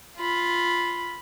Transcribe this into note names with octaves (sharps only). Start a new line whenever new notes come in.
F4 B5